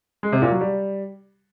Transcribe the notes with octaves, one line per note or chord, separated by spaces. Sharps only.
G#3
C3
A#2
F#3
G3